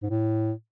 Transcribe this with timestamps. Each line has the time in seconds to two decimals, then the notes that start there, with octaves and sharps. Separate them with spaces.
0.03 G#2
0.10 A2